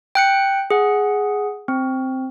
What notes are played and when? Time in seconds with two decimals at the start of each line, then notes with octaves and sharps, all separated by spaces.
0.15 G5 F#6 C#7
0.71 G#4 F#5
1.68 C4